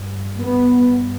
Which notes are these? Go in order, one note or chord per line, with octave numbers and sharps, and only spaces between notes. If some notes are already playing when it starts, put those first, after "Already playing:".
Already playing: G2
B3